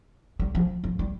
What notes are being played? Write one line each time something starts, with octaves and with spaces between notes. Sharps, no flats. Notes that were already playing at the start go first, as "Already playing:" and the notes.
G3
F3
F3
G3